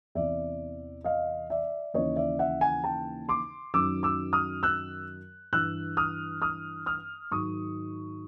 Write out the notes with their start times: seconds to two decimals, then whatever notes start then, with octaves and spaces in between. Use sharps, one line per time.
0.15 E2 C3 E3 D5 E5
1.04 D#5 F5
1.50 D5 E5
1.94 D#2 C#3 E3 C#5 D#5
2.16 D5 E5
2.39 E5 F#5
2.61 F#5 G#5
2.84 G5 A5
3.29 C6 D6
3.74 F#2 D#3 F#3 D6 E6
4.03 D6 E6
4.33 D#6 F6
4.63 E6 F#6
5.53 G2 E3 E6 F#6
5.97 D#6 F6
6.42 D#6 F6
6.86 D#6 F6
7.31 G#2 D#3 F#3 C#6 D#6